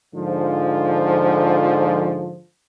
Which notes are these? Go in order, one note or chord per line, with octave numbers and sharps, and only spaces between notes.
G#2 D3 F3